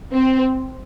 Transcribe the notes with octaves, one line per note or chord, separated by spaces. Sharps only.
C4